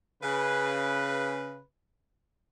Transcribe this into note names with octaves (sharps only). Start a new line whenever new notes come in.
C#3 B4